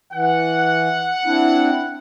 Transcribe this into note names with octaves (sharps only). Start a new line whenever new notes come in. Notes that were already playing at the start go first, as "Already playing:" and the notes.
E3 F#5
C4 D4 E4